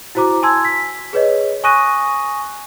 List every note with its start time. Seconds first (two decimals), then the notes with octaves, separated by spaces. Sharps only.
0.15 E4 F#4 C5 A#5 D6
0.43 G#5 A5 C6 E6 G#6
0.65 B6
1.13 G#4 B4 C#5 D#5
1.64 G#5 C#6 D#6 F#6 A#6 D#7